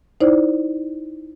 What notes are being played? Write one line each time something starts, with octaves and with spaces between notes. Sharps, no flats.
D#4 E4 C5 D5